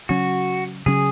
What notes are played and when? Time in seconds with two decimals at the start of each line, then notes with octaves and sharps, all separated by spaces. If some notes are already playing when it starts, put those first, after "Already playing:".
0.09 C#3 F#3 C#4 F#4
0.86 C#3 F#3 C#4 G#4